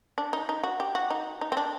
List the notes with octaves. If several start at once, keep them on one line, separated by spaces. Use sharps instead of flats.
D4
D#4
D#4
F#4
G4
F#4
D#4
D#4
C4
D4